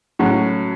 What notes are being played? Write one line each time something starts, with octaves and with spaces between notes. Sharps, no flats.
A2 F#3 C#4 F#4